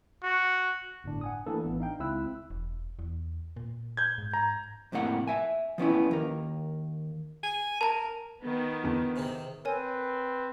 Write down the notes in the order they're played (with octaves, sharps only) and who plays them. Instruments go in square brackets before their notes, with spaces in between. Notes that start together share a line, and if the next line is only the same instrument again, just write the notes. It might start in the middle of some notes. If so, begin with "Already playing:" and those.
[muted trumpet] F#4
[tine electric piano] G1 A2 D4
F#5 G#5 D#6
E3 A3 A#3 D4 A4 B4
A1 E3 B3
D4 D#4 F5 G5
C#2 C4 E4 E6 F#6
[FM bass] E1
E2
A#2
[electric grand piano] G6 G#6
[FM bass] G#2
[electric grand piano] A#5
[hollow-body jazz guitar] F2 A2 C3 A#3 F#5
E5 G#5
F3 B3 C#4 E4
D#2 A#4
[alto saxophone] G#5
[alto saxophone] A#4 [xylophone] A5 A#5
[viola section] D#3 B3
[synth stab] E2 D3
[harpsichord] G#2 C3 D#3
[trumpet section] C4 B4 [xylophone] A#4 C#5 G#5